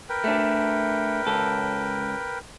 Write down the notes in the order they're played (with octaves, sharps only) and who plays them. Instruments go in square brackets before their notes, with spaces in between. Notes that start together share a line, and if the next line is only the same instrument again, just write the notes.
[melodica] A#4 B4 G5
[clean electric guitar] A3 D4
C#2 A4